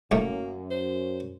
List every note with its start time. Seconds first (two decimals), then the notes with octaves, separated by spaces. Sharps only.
0.11 C2 F#2 A2 A3 A#3
0.70 C5